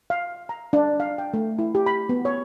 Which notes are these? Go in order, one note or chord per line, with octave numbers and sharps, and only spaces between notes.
F5
A#5
D4
F5
G5
A3
E4
G4
B5
B3
C#5